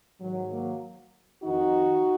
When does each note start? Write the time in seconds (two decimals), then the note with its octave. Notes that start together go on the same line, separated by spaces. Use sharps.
0.21 G#2 D#3 F#3
0.52 F#3 A#3
1.43 F2 D#3 D#4 F#4